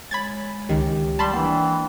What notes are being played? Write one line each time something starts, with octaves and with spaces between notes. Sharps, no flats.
G#3 C#5 B5 G#6 A6
C#2 D#3 G4
G3 A5 B5 C6
E3 A#3 D4 D5 F#5 G5